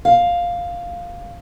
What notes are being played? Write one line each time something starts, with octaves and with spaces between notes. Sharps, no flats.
F5